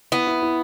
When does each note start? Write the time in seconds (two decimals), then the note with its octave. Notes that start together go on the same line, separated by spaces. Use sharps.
0.12 B3 E4
0.27 E4
0.42 E4